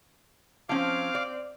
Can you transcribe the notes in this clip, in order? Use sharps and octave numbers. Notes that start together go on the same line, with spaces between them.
F3 C4 C#4 F5 D6 F6
D5